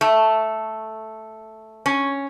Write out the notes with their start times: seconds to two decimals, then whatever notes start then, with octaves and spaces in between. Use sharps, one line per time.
0.01 A3
1.86 C#4